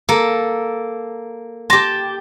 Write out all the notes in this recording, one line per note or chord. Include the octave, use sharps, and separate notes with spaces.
A#3 A4
G4 A5 C6 A#6